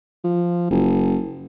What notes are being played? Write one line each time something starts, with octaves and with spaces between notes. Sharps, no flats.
F3
F#1